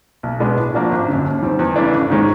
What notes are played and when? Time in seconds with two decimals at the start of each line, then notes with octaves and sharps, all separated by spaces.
0.23 B1
0.40 B2 G#3 B3 D4
0.57 A2
0.74 F3 A#3 D4 F#4
0.91 G#1
1.08 F#2 D3
1.25 D#2
1.42 D#3 G3 C4
1.59 E2
1.76 C#3 E3 A3 D4
1.93 G#1
2.10 G#2 D#3 G#3 C#4